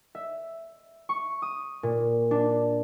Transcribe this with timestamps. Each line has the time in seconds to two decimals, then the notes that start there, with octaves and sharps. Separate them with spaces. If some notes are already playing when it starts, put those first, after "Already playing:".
0.15 E5
1.09 C#6
1.42 D#6
1.83 A#2
2.31 D4